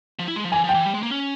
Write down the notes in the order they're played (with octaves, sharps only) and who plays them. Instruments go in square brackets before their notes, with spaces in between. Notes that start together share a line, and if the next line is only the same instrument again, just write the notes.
[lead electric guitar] F3
E4
G#3
F3
[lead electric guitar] E3 [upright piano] G#5
[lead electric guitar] F3 [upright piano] G5
[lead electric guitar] E3
G3
G#3
A#3
C#4